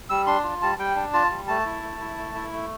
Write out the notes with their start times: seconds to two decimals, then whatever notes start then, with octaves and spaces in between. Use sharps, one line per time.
0.10 G3 E6
0.27 D4 C6
0.44 F4
0.62 G3 A5
0.78 G3 G5
0.95 D4
1.13 F4 A5
1.30 G3
1.47 A3 A5
1.65 E4
1.82 A3
2.00 E4
2.17 A3
2.34 E4
2.52 A3